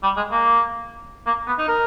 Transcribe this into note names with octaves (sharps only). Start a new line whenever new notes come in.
G3
G#3
A#3
A#3
B3
D#4
A#4